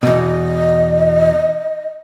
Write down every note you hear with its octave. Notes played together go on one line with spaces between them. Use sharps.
E2 B2 D#5